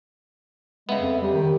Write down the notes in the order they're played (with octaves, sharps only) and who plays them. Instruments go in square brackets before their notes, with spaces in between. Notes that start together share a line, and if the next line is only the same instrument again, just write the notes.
[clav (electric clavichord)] C#3 B3 [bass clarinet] G#3 [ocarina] E5
[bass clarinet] F2
[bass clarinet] G3 [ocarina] G4
[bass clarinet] D#3